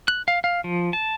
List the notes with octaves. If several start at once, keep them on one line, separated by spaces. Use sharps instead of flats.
F#6
F5
F5
F3
A5